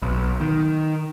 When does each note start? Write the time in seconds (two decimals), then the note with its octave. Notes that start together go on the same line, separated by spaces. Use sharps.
0.02 B1
0.41 D#3